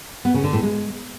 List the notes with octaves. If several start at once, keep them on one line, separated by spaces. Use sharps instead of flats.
B3
C#3
D3
A2
G#3